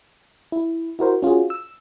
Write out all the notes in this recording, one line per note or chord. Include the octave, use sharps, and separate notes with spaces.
E4
E4 F#4 A#4 C5
C#4 F4 F#4 G#4
E6